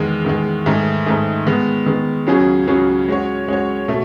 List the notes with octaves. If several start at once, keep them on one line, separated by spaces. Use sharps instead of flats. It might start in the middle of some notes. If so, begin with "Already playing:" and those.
Already playing: E2 D#3 G#3
E2 D#3 G#3
G#2 D#3 A3 D#4 G#4
G#2 D#3 A3 D#4 G#4
D#3 G#3 B3
D#3 G#3 B3
C#2 C#3 F#3 C#4 G#4
C#2 C#3 F#3 C#4 G#4
G#3 C#4 F#4 C#5
G#3 C#4 F#4 C#5
B2 A3